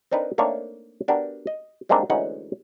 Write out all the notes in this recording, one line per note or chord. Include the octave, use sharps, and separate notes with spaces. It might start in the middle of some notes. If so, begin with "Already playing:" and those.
C4 D4 D#4 A#4 B4
A3 A#3 C4 D4 D#4 C#5
B3 D4 F#4 G4 A#4
D#5
G3 G#3 A#3 C4 D4 D#4
D2 E3 G#3 C#4 D#4 F#5